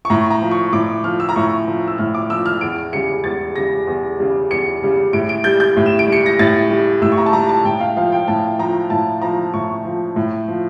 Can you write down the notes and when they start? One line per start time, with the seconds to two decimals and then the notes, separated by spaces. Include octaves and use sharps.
0.05 C#6
0.10 A2 A#5
0.30 A#5
0.41 F3
0.51 C#6
0.73 A2 D6
1.04 F3 F6
1.20 E6
1.29 A#5
1.36 A2 C#6
1.67 F3
1.88 E6
1.98 A2 F6
2.14 D6
2.30 F3 E6
2.46 F6
2.61 E2 D7
2.93 C#3 G3 C#7
3.24 E2 A6
3.55 C#3 G3 A#6
3.87 E2
4.19 C#3 G3
4.50 E2 C#7
4.82 C#3 G3
5.13 A2 D7
5.29 D7
5.44 G3 G6
5.60 G6
5.77 A2
5.86 E7
5.99 D7
6.07 G3
6.12 C#7
6.26 A#6
6.39 A2 A6
6.70 G3
7.02 A2 E6
7.12 C#6
7.17 A#5
7.26 A5
7.33 G3 A#5
7.49 A5
7.64 A2 G5
7.80 F5
7.97 F3 F5
8.12 G5
8.28 A2 A5
8.59 F3 A#5
8.90 A2 A5
9.22 F3 A#5
9.53 A2 C#6
9.85 F3
10.16 A2
10.48 F3